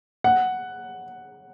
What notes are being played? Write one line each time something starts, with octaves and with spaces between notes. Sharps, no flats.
F#5